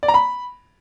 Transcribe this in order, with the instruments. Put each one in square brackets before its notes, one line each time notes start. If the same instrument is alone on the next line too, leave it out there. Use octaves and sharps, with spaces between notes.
[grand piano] D5
A#5
B5